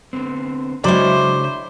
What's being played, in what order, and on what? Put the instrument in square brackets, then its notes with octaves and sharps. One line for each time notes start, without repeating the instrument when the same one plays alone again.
[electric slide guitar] D3 B3 C4
[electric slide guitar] C#3 D4 G5 [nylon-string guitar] F#3 G#3 [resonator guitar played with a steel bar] E4 D5 [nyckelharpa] C5